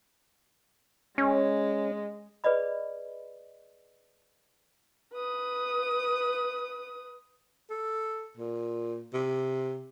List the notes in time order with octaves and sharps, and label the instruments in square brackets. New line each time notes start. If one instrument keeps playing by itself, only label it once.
[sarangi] G#3 [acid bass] C#4
[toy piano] G#4 B4 D5 D#5 B5
[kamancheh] B4 D#6
[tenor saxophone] A4
A#2
C3